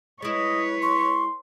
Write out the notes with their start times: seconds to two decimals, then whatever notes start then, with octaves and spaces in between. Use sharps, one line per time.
0.22 G#3 E4 B4 C#5 D#5
0.82 C6 C#6